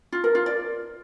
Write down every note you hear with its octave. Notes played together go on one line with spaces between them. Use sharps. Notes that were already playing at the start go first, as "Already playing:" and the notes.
F4
A#4
F4
D5